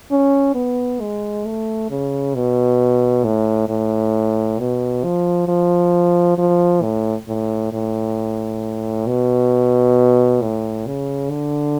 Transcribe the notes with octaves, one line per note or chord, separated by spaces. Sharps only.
C#4
B3
G#3
A3
C#3
B2
A2
A2
B2
F3
F3
F3
A2
A2
A2
B2
A2
C#3
D3